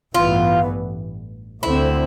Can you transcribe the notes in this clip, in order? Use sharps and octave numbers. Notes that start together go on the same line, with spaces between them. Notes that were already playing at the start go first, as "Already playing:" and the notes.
A1 G2 E3 B3 F4
D2 D3 A3 C4 E4